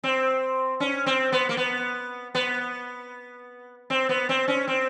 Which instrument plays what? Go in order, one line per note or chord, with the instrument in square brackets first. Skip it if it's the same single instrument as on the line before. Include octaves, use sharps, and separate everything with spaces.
[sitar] C4
C#4
C4
B3
A#3
B3
B3
C4
B3
C4
C#4
C4